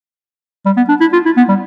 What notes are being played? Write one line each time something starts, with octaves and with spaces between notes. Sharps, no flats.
G3
B3
D4
E4
F4
E4
B3
G3